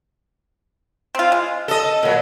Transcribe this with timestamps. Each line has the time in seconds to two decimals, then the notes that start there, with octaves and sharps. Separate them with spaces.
1.15 C4 F4
1.32 G#3
1.68 A4 D#5
2.03 A#2 F#3